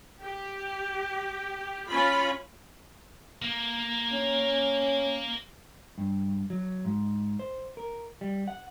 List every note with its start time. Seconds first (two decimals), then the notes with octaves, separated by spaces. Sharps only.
0.21 G4
1.87 C#4 F4 B5
3.42 A#3
4.12 C#4
5.98 G2
6.50 F#3
6.85 G#2
7.39 C5
7.77 A#4
8.21 G3
8.48 F#5